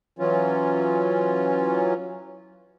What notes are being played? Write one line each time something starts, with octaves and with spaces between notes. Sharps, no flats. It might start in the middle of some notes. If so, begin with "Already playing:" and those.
E3 F#3 C#4 F4